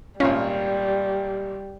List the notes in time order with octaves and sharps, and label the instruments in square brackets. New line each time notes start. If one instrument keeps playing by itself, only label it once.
[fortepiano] G#1 A#2 F4 [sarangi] G3 [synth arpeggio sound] C#4